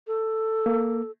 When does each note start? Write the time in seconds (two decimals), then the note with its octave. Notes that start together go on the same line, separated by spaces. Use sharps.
0.08 A4
0.66 A#3